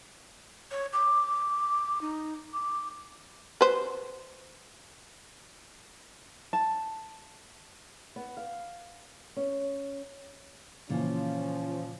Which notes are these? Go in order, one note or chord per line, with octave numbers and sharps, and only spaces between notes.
C#5
D6
D#4
D6
B4 C5
A5
B3
F5
C#4
A#2 C#3 E3 F3 C#4